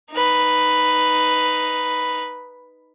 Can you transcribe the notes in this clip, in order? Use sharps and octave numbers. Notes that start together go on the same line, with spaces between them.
D#4 B4